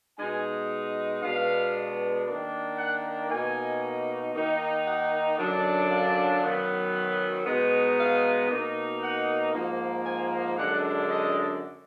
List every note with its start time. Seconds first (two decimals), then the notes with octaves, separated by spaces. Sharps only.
0.18 B2 G#3 D#4 G#5
1.22 B2 G#3 B3 D4 F5
2.26 D#3 A#3 D4
2.78 F#5
3.29 B2 A#3 D#4 G#5
4.34 D#3 A#3 D#4
4.86 F#5
5.37 F#2 D3 F#3 D4
5.90 F5
6.42 F#2 D#3 F#3 B3
7.46 B2 G#3 B3 D#4
7.98 F5
8.50 B2 A#3 D#4
9.02 F#5
9.53 G#2 F3 A#3
10.05 G#5
10.57 F#2 D3 G#3 D4 F#5
11.09 D#5